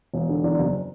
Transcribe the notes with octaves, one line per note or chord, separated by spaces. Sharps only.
E1
D3
E2
F#1